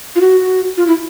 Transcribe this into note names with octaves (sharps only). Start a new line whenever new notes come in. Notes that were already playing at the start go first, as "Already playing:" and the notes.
F4
F#4
F4
E4